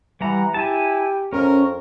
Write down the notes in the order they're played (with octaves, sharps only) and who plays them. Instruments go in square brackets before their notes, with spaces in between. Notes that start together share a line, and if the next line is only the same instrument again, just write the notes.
[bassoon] E3 [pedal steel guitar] G3 F#5 A#5
[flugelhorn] E4 [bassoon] G4 [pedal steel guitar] G#5 A5
[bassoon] F2 [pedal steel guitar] C#4 [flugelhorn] A#4